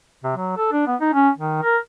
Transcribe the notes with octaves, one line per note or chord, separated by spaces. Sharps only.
C3
F#3
A4
D4
B3
D#4
C#4
D#3
A#4